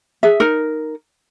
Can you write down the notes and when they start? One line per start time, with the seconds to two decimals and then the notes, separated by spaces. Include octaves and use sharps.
0.23 G#4 E5
0.40 D#4 A#4